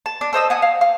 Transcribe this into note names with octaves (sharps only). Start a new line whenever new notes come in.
A5
D4
A4 C5 D#5 E6
F#5 G#5 D#6
F5
F5